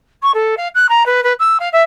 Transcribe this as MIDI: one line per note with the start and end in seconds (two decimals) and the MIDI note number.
0.22 0.31 85
0.34 0.54 69
0.57 0.68 77
0.75 0.87 90
0.89 1.05 82
1.06 1.23 71
1.23 1.33 71
1.39 1.57 88
1.59 1.69 77
1.72 1.82 76